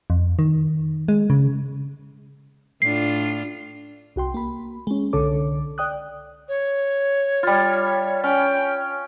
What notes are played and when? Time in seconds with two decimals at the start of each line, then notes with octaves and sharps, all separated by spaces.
0.10 F2
0.39 D#3
1.08 G#3
1.30 C#3
2.82 A2 D4 F4 C7
4.16 C2 F#4 G5 C6
4.34 A#3 B5
4.87 G#3 C#4
5.13 C2 D3 A4 C#5 D6
5.78 D5 G5 D#6 F#6
6.49 C#5
7.43 G3 F4
8.24 C#4 G5